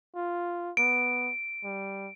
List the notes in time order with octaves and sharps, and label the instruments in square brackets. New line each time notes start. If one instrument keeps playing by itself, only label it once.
[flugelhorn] F4
[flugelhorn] B3 [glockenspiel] D7
[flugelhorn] G3